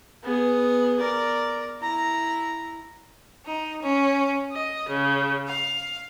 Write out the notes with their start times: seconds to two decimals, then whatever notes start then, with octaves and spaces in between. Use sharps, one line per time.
0.24 B3 G#4
0.99 A#4 D5
1.82 E4 A#5
3.45 D#4
3.81 C#4
4.52 D#5
4.89 C#3
5.47 F5